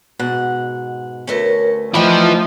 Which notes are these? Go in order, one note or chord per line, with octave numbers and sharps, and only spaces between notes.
G#2 B2 F#5
D2 A3 C#4 A#4 B4 C#5
D3 F3 A3 D#4 E4 B4 G5